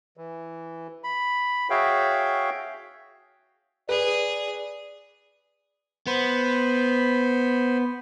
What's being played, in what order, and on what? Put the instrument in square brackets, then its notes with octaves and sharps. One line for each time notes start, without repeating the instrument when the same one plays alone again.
[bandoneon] E3
B5
F#4 G#4 C#5 E5 F5 G5
[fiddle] G#4 [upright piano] B4 [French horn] D5
[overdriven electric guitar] B3 [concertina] C5 B5